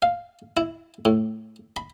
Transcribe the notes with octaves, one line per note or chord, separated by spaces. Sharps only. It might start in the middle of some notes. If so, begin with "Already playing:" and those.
F5
E4
A2
B5